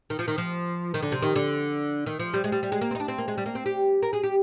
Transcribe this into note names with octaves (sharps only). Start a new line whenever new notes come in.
D#3
F3
D#3
F3
D#3
D3
C3
D#3
D3
D#3
F3
G3
G#3
G3
G3
G#3
A#3
C4
D#4
D4
C4
A#3
G#3
G3
A#3
C4
G4
A#4
G#4
G4